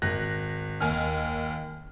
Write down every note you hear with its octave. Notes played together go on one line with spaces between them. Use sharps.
G#1 F#6 A#6
D#2 G#5 F6